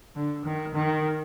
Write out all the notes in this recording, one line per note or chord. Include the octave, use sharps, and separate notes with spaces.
D3
D#3
D#3